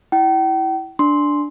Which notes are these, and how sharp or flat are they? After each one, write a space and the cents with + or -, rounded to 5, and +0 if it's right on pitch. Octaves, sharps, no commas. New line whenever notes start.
E4 +0 G5 -40
D4 +0 C6 +0